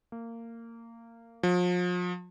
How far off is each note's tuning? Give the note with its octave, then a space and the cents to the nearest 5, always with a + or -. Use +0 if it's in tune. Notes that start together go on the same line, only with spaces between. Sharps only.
A#3 -20
F3 +40